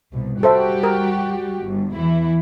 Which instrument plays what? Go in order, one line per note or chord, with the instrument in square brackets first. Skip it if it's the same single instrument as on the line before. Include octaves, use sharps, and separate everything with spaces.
[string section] C2 B2
[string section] G3 F#4 G4 [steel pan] A4 C5 E5
[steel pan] A#4
[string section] G1
E2 E3 E4